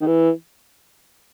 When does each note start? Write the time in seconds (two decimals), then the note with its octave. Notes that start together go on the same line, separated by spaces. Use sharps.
0.01 D#3
0.07 E3